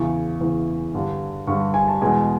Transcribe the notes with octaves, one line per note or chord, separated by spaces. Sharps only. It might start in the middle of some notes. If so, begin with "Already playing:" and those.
Already playing: E2 C#3 E3 C#6
E2 C#3 E3
G2 D3 G3
G2 D3 G3 C#6
G#5
A5
E2 B2 G#3 G#5